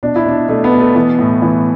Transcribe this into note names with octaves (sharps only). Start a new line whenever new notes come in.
B2 D4
E4
B2 D4
B2 A3
B3
B2
A3
E3 B3
A2
E3